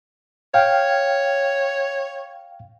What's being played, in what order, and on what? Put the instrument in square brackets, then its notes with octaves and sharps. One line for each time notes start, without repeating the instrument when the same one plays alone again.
[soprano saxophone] C#5 [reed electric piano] F5 G5